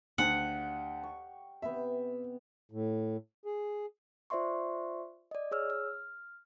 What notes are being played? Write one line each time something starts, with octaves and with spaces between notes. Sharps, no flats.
D2 G4 D5 F5 F#5
C#6
C3 B3 E5
A2
G#4
F4 C5 D5 E5 C6 C#6
D5 D#5
G#4 C#5 E6 F6
F6